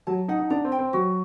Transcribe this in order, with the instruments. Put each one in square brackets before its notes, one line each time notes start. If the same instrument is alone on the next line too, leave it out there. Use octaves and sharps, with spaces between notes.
[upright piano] F#3 [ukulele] A5
[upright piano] D#4 [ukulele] F#5
[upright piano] D#4
[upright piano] D4 [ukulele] A#5
[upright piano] C4
[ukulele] G5
[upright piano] C4
[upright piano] F#3 [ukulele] F#4